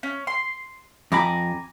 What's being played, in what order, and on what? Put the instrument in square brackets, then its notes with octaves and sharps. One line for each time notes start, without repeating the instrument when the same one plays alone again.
[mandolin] C#4
C6
[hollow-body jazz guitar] F2 B5 [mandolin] G#5 A#5 D6